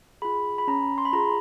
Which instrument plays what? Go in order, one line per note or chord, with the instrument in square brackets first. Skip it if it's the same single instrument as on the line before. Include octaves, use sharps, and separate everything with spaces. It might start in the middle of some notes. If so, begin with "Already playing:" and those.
[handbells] F4 G#4 B5
B5
C#4 A#5
C6
B5
F4 G#4 A#5